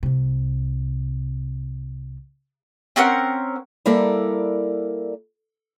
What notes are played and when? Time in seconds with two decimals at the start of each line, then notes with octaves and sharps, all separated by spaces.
0.03 C2 C3
2.96 C4 C#4 A#4 F#5
3.86 G3 A#3 E4 A4 A#4 D5